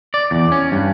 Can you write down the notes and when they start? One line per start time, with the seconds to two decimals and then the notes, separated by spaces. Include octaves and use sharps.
0.14 D5
0.31 E2
0.52 C#4
0.72 G2